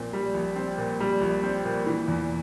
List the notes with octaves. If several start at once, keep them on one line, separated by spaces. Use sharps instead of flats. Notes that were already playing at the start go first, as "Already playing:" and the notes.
Already playing: A#1 A#2 C4
G3
A#1
C4
A#2
G3
A#1
C4
A#2
E3
E2